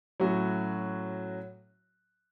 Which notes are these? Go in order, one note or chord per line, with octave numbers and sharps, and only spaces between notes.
A2 F#3 C#4 F#4